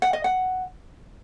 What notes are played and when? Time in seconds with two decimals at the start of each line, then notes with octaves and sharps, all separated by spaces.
0.02 F#5
0.13 D#5
0.24 F#5